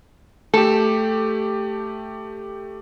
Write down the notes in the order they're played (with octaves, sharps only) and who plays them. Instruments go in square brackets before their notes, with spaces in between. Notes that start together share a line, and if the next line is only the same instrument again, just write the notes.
[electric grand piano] A3 G4 [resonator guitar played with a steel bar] A4